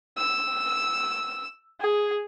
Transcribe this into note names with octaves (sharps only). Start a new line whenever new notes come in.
E6
G#4